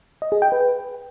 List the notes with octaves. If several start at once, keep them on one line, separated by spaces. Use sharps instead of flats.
D#5
G#4
G5
B4